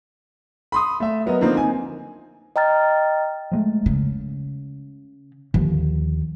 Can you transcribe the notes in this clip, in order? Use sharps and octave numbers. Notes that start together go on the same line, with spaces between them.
B5 C6 D#6
A3 E5
F#3 B3 A#4 D#5
D3 F3 A#3 C4 D#4
D#4 G#5
D#5 G5 A#5 F6 A6
F3 G#3 A3
C#3
D#2 D3 F3